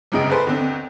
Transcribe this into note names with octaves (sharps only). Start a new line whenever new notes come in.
G1 C#2 F#2 C#3 D#5 D7
G#4 A4 B4 C5 C6
D#2 D3 C4